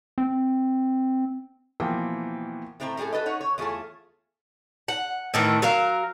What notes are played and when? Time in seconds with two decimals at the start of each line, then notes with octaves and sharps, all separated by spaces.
0.18 C4
1.80 B2 E3 F3 A#3 G5
2.80 A2 A3 C4 E4 A#5
2.97 A2 G3 A#3 G#4 A4
3.12 F#4 A4 B4 D#5
3.26 D#4 C#5 F#5
3.41 C#5
3.58 E2 A3 F4 G#4 C#5 A5
4.88 F#5
5.34 A2 D#3 E3
5.62 F#3 A#4 F5